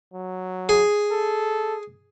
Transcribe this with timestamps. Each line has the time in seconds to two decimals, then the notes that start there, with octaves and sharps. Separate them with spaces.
0.13 F#3
0.69 G#4
1.11 A4